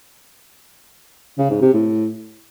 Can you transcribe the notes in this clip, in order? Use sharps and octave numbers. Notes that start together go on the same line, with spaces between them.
C#3
G#2
C3
A2